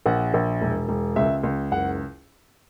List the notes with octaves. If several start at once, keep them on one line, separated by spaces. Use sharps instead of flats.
A#1 F#5
A#1
E1
E1
C#2 E5
C#2
F#1 F#5